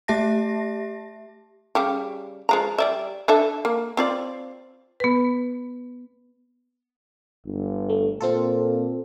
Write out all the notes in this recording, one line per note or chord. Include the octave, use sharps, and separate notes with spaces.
A3 G4 E5 A5 A#6
C#3 G3 G4
F3 G#3 A#5
G3 D5 E5
D4 A4 E5
A#3
C4 F4 D5
B3 B4
G1
A3
A#2 C4 F4 A4